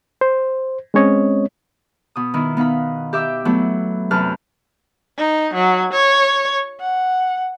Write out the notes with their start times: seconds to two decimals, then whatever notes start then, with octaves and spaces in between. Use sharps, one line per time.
0.21 C5
0.94 G#3 C4 C#4 C#5 D#5
2.16 B2 D#6
2.34 D#3 B3 D#4 E4
2.57 B3 D#4 F5 F#5 B5
3.13 G4 E5 D6 E6
3.45 F#3 A3 B3 E4
4.11 F#2 C3 B4 A5 F6 F#6
5.18 D#4
5.54 F#3
5.93 C#5
6.80 F#5